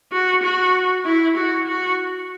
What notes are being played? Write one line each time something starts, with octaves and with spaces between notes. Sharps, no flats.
F#4
F#4
E4
F#4
F#4